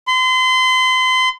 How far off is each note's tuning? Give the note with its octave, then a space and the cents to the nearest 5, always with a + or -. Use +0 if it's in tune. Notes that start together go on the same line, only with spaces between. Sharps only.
C6 -35